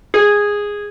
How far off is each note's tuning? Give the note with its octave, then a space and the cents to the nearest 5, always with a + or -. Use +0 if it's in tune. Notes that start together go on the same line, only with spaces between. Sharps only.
G#4 -10